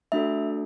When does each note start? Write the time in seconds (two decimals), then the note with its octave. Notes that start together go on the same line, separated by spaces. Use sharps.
0.12 A3 D4 F#4 A4 E5